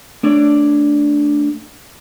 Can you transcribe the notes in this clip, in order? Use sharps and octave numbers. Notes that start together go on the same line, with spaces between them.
A3 D4 C#5 D5